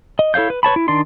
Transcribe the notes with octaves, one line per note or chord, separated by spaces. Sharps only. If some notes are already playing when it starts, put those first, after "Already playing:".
D#5
E4 A4 C#5 F5 G6
B4
B4 C#5 A5 B5
E4
D#3 D4 D5 C6